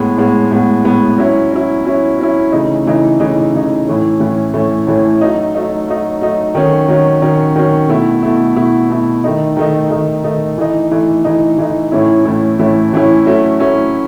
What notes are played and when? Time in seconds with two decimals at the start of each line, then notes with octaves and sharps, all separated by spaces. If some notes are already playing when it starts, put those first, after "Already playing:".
Already playing: A2 G#3 B3
0.17 A2 G#3 B3
0.51 A2 G#3 B3
0.84 A2 G#3 B3
1.18 F#3 C#4 E4
1.52 F#3 C#4 E4
1.85 F#3 C#4 E4
2.18 F#3 C#4 E4
2.52 C#3 E3 A3 D#4
2.86 C#3 E3 A3 D#4
3.20 C#3 E3 A3 D#4
3.53 C#3 E3 A3 D#4
3.87 A2 E3 A3 C#4
4.20 A2 E3 A3 C#4
4.54 A2 E3 A3 C#4
4.87 A2 E3 A3 C#4
5.21 F#3 A3 D#4
5.55 F#3 A3 D#4
5.88 F#3 A3 D#4
6.21 F#3 A3 D#4
6.55 D#3 F#3 C#4
6.88 D#3 F#3 C#4
7.22 D#3 F#3 C#4
7.56 D#3 F#3 C#4
7.89 B2 A3 E4
8.23 B2 A3 E4
8.56 B2 A3 E4
8.90 B2 A3 E4
9.24 D#3 A3 D#4
9.57 D#3 A3 D#4
9.91 D#3 A3 D#4
10.24 D#3 A3 D#4
10.58 E3 A3 D#4
10.91 E3 A3 D#4
11.25 E3 A3 D#4
11.58 E3 A3 D#4
11.92 A2 E3 A3 C#4 E4
12.25 A2 E3 A3 C#4 E4
12.59 A2 E3 A3 C#4 E4
12.93 A2 E3 A3 C#4 E4
13.26 F#3 A3 C#4 E4
13.60 F#3 A3 C#4 E4